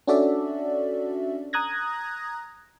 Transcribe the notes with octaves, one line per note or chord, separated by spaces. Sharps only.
C#4 D4 F#4 A4 D5 E5
A#5 D#6 F#6 G#6 A#6